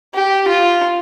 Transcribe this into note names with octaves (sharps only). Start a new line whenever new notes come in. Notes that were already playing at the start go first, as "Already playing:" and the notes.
G4
F4